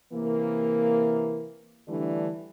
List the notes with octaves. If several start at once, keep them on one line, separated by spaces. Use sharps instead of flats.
C3 E3 A#3
D3 E3 G3 A3 D4